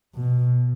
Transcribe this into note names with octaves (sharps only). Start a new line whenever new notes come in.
B2